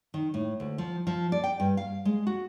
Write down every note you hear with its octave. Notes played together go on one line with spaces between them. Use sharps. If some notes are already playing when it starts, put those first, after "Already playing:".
D#3
A2
D2
F3
F3
D5
G5
G2
F5
G#3
F#4